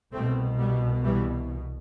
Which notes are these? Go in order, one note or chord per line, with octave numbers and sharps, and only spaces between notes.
C2 B2 A3 C4
G3 B3
E3 G3